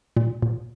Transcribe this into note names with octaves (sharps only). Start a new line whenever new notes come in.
A#2
A#2